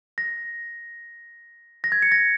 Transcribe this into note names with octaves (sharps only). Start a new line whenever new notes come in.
A#6
A#6
G#6
C#7
A#6